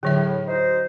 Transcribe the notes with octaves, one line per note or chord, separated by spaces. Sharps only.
A2 D3 F#3 E5
D#4 F#4 C5